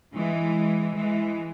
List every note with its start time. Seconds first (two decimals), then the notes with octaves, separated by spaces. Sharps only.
0.15 E3 G#3
0.96 E3 G#3